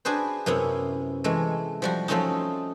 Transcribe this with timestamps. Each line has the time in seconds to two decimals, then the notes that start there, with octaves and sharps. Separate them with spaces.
0.05 D4 F#4 G#4 B4 C5
0.46 F#2 C3 B3 C#4 E4
1.24 E3 G#3 A3
1.82 F3 G3 F#4
2.08 F3 F#3 A3 C4 C#4 D#4